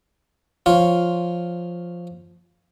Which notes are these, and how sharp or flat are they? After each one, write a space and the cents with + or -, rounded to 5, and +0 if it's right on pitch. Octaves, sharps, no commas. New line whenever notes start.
F3 +0 F4 +0 C#5 +0